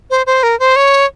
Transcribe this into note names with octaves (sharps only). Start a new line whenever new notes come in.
C5
C5
A#4
C5
C#5